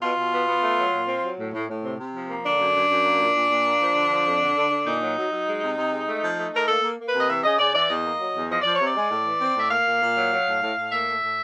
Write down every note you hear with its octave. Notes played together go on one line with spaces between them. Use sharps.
B2 F4
B2
B3
B3
A3
F#3
A#2
C4
F#3
A2
A2
A2
C3
C3
F3
A#3
D3 D4
F#2
F#2
F#2
A#3
A#2
A#2
A#2
A#3
F3
D3
F3
F2
D3
D3
D3
A#2 D#4
F#3
F#3
F#3
G#3
C3
C3
G#3
A3
F3
A3
A3 A#4
A#3 A4
A#3
A#3
B4
C3
D#5
E3 E5
C#3 D#5
C#3 D5
E3 D5
E2 D#5
A#3
F#3
E2
F3 D#5
F3 D5
C#5
C3
D5
G#3
A2
E3
C4
A2 E5
A#3 F5
A#2
A#2
F#3
F#3
A2
A2
A2
A#3 E5
A2
A2